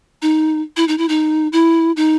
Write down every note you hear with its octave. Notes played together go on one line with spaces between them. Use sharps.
D#4
E4
D#4
E4
D#4
E4
D#4